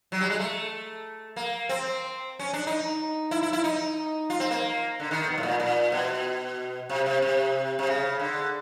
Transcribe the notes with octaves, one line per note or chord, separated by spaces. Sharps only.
F#3
G3
G#3
A3
A#3
C4
C#4
D4
D#4
E4
E4
E4
D#4
F4
C4
A#3
D3
D#3
B2
A2
A#2
A#2
B2
C3
C3
C3
C3
C#3
D3